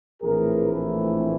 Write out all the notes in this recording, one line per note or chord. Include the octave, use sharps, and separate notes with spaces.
A#1 A2 E3 A3 C4 G#4 A#4
A4 B4